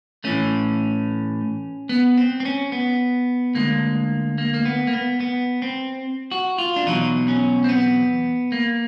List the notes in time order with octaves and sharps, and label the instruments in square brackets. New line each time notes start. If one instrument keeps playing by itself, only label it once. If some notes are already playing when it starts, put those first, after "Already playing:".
[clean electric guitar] A2 E3 A3 C#4
B3
C4
C4
C#4
B3
D2 D3 F3 G#3 A#3
A#3
A#3
B3
A#3
B3
B3
C4
F#4
F4
D4
E2 B2 F#3 D#4
C#4
C4
B3
A#3